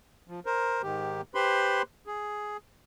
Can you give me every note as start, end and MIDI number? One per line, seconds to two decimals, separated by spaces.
0.28 0.40 53
0.46 0.82 70
0.46 0.82 72
0.83 1.21 44
0.83 1.21 51
0.83 1.21 67
1.35 1.82 67
1.35 1.82 71
1.35 1.82 72
1.35 1.82 83
1.35 1.82 84
2.07 2.57 68